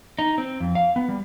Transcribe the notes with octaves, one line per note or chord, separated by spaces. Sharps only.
D#4
C4
F2
F5
B3
G3